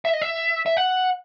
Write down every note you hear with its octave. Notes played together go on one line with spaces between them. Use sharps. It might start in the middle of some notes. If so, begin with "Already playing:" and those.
E5
D#5
E5
E5
F#5